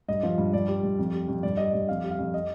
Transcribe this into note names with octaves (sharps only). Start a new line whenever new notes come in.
G2 D#5
F3
G2
G2 D5
G3
G2
F2
G3
F2
G2 D5
G3 D#5
G2 D5
F2 F5
G3
F5
F2
D#5